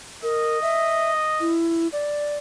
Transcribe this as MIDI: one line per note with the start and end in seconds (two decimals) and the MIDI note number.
0.23 0.60 70
0.23 1.56 75
0.62 1.12 76
1.40 1.88 64
1.92 2.37 74